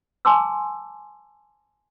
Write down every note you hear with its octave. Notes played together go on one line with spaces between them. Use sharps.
G#5 A5 C6 D6 E6